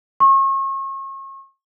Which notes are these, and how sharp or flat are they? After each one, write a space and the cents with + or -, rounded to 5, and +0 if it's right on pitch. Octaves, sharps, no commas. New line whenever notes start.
C#6 -35